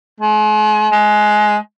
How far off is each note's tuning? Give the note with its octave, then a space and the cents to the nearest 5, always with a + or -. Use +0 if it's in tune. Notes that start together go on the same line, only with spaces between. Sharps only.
G#3 +40
G#3 +20